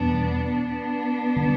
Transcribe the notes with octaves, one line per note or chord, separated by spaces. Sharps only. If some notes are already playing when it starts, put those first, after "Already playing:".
Already playing: E2 B2 G3 B3 D4
B3 D4
D3 G3 C#4